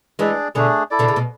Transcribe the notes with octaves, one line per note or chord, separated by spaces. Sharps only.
E3 G#3 D4 G#4 D5
B2 D3 A3 D4 G#4
E4 A4 D5
B2 D3
C#3
B2